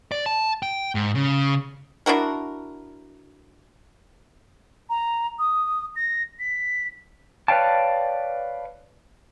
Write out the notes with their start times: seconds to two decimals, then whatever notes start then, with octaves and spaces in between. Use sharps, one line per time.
0.12 D5
0.26 A5
0.63 G5
0.95 G#2
1.15 C#3
2.06 D4 E4 F#4 A#4
4.89 A#5
5.39 D#6
5.96 A#6
6.39 B6
7.48 B4 C#5 D5 F5 G5 A5